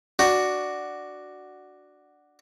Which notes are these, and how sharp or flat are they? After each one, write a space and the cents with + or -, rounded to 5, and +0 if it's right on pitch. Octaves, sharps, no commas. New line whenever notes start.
D4 +5 F#4 +5